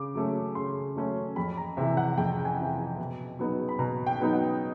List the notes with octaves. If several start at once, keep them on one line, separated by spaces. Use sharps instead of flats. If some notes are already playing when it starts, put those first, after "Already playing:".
Already playing: C#3 D6
F#3 A3 C#4
C#3 C6
F#3 A3 C#4
F2 B5
A#5
C3 E3 E5
F#5
F2 G5
G#5
C3 E3
B2
F#3 B3 D#4
B5
B2 A#5
G5
F#3 B3 D#4
F#5